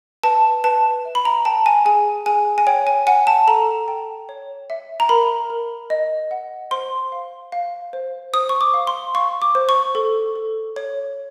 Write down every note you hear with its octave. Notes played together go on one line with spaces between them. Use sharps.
B4 A5
B4 A5
E5
B5
A#5
G5 A5
G#5
G#4 G#5
G#4 G#5
G#5
C#5 G5
G#5
F#5 G#5
A5
A4 A#5
G5
C#5
E5
A#5
A#4 B5
A#4
D#5
F#5
C5 C6
F5
F5
C5
C5 D#6
C#6
D6
F5
C6
F5 C#6
D6
C5
C#6
A4
A4
C#5